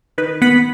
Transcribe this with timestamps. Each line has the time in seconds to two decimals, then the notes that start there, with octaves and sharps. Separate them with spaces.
0.18 D#3 B4
0.42 B3 F#5 B5